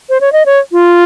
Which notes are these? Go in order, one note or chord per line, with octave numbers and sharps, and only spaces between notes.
C5
C#5
D#5
C#5
F4